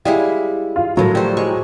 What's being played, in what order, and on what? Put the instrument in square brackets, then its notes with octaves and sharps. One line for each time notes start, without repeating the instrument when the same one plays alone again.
[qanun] G3 G#3 E4 [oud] F5
[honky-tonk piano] F4
[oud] A2 F3 A#4 [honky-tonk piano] F#3
[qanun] G3 C5
G#3 C#6